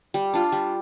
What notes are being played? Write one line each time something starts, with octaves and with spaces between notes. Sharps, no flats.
G3
D4 F4
G3